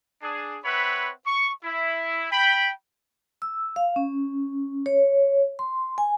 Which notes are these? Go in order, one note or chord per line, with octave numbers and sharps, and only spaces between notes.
D4 G#4
C4 B4 C#5 E5 F#5 B5
C#6
E4
G5 B5
E6
F5
C#4
C#5
C6
G#5